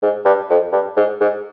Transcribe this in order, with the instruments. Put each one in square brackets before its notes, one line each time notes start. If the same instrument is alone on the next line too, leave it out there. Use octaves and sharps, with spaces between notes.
[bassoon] G#2
G2
F2
G2
G#2
G#2